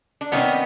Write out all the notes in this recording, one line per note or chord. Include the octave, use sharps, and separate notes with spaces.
D4
C3 D#3 G3 B3 C#4